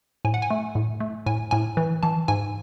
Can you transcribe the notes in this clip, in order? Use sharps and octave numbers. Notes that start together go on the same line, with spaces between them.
A2 G#5
F#5
G#5
A3
A2
A3
A2 G#5
A2 G#5
E3
E3 A5
G#2 G#5